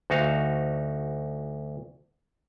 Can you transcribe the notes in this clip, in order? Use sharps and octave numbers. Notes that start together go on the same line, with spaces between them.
D2 D#4 F#4 F5